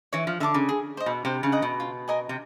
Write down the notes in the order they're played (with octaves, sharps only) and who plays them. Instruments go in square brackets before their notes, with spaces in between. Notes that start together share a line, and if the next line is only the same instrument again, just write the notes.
[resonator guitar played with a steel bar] E3 [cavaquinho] C#5
[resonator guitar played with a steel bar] F3
[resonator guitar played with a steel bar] D3 [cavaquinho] E5 A5 D6
[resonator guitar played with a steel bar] C#3
[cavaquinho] G#4
C5 D#5
[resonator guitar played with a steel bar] B2
[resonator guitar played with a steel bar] C3 [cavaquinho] C5
[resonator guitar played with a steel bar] C#3
[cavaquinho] D#5 F#5 A#5
[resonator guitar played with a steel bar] B2
[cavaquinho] F4
A#4 D#5 G#5
[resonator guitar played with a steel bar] C3